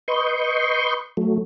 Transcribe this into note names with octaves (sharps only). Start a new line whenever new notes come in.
B4 D#5 C6 C#6 G6
F#3 A3